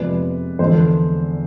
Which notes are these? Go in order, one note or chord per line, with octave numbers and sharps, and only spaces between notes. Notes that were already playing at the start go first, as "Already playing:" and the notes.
Already playing: F2 C3 G#3 B3 B4 D5
E2 D3 F3 G#3 B3 A4 C5